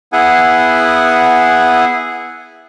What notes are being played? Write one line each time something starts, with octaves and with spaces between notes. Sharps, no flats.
B3 E4 G#4 F#5 G#5